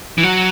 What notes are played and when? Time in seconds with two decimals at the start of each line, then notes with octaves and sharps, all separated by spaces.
0.18 E3
0.23 F#3